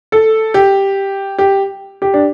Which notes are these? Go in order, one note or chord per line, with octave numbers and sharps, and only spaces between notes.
A4
G4
G4
G4
D4